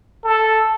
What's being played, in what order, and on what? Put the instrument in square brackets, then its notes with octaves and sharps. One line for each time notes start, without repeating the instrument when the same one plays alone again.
[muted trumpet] A4